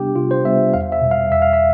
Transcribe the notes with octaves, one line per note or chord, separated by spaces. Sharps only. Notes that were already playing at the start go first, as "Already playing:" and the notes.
Already playing: C3 G3 B3 D4 G4
C3 F4
C5
G3 B3 D4 E5
E2 F5
E5
B2 G3
F5
E2 E5
F5
E5